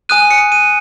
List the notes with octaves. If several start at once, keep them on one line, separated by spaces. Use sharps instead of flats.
G#5 D#6 F#6 D#7
C#7
D#7